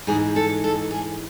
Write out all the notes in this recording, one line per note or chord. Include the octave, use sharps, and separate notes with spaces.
G#2 E3 G#3 G#4
A4
A4
G#4